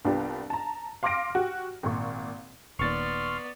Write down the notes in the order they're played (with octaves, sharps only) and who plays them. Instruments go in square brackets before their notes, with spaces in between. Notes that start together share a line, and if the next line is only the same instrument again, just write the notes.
[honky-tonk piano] C2 B3 D4 F4 G4
A5 A#5
F5 C6 D6 F6 A#6 D7
F#4 G4
G#1 A#2 C#6
[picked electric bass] D#1 D#2 [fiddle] B3 D5 [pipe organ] C6 F6 [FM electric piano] C#6 A6